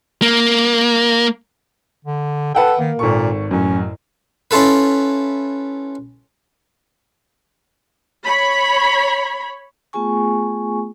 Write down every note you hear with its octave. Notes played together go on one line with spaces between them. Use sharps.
A#3
D3
A4 B4 F#5 G5
D#3 A#3
G#1 A#2 A4 C#6
A1 F#2 C#4
C#4 E4 F4 A4 B4
C#5 B5
A3 B3 F4 G#4 G#5 C#6